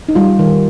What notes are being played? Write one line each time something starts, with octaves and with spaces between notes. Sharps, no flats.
D#4
G3 F4
D#3